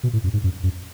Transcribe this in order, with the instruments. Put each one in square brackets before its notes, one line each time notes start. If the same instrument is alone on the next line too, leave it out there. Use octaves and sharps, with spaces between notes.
[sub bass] B2
A2
F#2
G#2
F#2
F#2